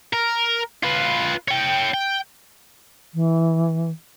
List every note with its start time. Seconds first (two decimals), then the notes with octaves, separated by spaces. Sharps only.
0.13 A#4
0.83 F4 B4
1.48 C#5 G5
1.94 G5
3.14 E3